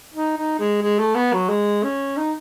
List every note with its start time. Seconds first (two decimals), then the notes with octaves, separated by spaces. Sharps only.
0.14 D#4
0.37 D#4
0.59 G#3
0.82 G#3
0.99 A3
1.15 B3
1.33 F#3
1.49 G#3
1.83 C#4
2.17 D#4